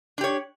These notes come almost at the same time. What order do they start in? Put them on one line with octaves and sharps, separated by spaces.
D4 G4 C#5